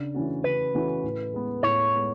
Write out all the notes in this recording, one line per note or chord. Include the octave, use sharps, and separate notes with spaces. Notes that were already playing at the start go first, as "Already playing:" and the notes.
Already playing: C#3 D4
E3 A3 C#4 F#4
C#3 B4
E3 A3 C#4 F#4
A2
G#3 B3
A2 C#5
G#3 B3